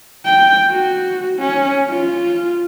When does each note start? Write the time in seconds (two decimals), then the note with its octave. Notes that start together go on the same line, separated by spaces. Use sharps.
0.25 G5
0.71 F#4
1.39 C#4
1.90 F4